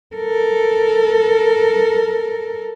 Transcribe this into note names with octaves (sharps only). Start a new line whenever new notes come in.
A4 A#4